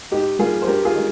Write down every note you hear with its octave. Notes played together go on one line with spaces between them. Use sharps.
G#2 D#4 G4
G3 A#3 F4 G#4
C5
G2 G4 A#4
F4 G#4
D#3 G#3